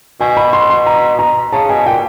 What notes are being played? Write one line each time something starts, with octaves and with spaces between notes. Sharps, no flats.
B2 G#5
B5
C6
C6
A#5
A#5
C#3 A5
B2 G#5
A#2 G5